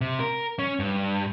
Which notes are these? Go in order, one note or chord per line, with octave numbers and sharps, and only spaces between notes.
C3
A#4
C#4
G2